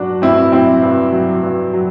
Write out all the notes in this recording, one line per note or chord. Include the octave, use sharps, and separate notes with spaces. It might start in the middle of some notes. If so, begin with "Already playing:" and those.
Already playing: G2 F#3 D4 F#4
G2 C4 E4
F#3 C4 E4
G2
F#3
G2
F#3